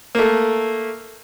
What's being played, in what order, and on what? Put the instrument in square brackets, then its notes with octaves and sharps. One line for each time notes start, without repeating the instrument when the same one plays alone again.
[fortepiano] A3 A#3